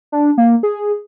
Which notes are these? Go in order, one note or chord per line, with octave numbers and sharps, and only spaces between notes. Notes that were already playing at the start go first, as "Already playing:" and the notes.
D4
A#3
G#4